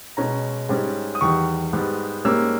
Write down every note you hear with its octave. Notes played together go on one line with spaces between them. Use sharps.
B2 G#3 C#4 A#5
G#2 G3 C#4
D#6
E2 D#3 G3 C#6
G#2 G3 B3
G#2 G3 A#3 C#4 E6